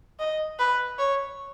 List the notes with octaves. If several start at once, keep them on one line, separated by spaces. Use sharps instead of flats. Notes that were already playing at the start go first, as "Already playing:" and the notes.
D#5
B4
C#5